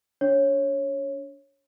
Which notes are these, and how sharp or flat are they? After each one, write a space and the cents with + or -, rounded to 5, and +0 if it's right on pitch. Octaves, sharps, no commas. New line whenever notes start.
D4 -35 C#5 -15